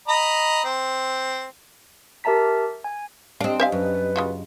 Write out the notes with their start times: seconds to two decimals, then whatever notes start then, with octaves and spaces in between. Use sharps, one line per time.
0.08 D#5 A#5 B5
0.64 C4
2.24 G4 A#4 E5 A5 A#5 B6
2.84 G#5
3.41 C4 D4 G4 D#5 F5
3.60 C5 E5 F5 G#5
3.72 F#2 B4
4.16 C#3 F4 F#4